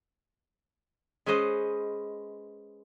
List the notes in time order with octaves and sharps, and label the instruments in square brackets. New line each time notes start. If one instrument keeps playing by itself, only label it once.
[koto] G#3 C#4 B4 C5 D#5